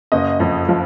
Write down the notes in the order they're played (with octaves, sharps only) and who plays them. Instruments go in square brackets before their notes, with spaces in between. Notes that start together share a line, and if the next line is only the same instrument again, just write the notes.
[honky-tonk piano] F#1 D#5
F2
F3